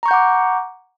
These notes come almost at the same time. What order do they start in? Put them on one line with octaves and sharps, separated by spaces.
A#5 C#6 G6 F#5 D6